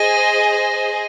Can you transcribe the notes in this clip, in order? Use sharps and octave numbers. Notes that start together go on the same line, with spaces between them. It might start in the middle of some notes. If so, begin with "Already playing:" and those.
Already playing: G#4 C5 D#5 A#6 D#7